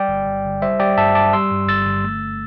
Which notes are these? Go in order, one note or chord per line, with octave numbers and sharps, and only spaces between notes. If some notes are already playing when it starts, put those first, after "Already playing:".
Already playing: G3 D5 G5
G1
G2
G1
G3 C5 E5
G3 D5 G5
G2 E5 A5
G2 A5 D6
G3 C6 E6
G2
G1 E6 A6
G1
A3